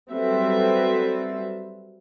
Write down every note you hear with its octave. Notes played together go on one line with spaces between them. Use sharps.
F#3 G3 C4 A4 B4 E5